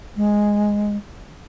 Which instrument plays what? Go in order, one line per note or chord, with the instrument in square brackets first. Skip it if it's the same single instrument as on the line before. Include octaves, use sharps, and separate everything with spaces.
[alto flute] G#3